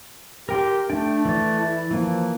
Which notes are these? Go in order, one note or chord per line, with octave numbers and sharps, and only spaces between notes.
G4 A#4 G5 C6
A3 D4 G5
E3 D5
E4
E3 F3 A#3